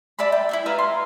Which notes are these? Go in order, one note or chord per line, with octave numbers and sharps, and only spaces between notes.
D5 E5 A5 B5
G5
E4 F4 E5
B4 E5 F5 A#5
C6